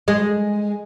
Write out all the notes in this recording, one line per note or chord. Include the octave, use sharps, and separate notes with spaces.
G#3